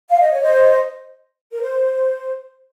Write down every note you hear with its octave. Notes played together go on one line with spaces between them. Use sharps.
F5
D#5
C#5
C5 D#5
A#4
C5